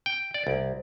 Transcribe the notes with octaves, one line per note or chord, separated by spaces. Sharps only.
G5
D5
C2